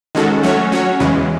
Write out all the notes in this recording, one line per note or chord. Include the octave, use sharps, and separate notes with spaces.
D#3 G#3 C#4 F#4 A4
F#3 A3 C#4 F#4 C#5
F#3 C#4 F#4 C#5
E2 C#3 E3 G#3